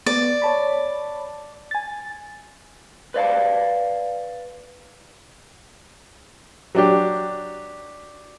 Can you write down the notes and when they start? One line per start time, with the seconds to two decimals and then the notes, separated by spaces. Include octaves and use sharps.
0.06 B3 D5
0.42 C#5 A5 B5
1.71 G#5 A6
3.14 B4 D5 F5 A5
6.75 F#3 D4 G4